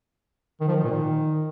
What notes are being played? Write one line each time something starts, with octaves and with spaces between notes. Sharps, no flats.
D#3
F3
D#3
A#2
D#3